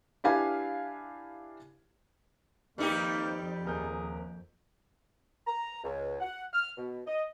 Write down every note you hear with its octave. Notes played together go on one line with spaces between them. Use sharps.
D4 E4 G4 B4 F5 G#5
F2 D#3 G3 A#3 D#4 G4 B4
D#1 G#4 A#4 G6
A#5
C#2
F#5
F6
B2
D#5